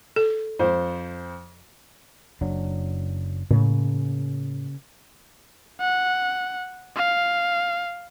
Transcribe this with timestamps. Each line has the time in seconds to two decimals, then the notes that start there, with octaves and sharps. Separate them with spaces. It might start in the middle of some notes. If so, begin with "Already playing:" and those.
0.16 A4
0.59 F2 C5
2.41 F#1 F#3 D4
3.51 A2 C#3 A#3
5.81 F#5
6.96 F5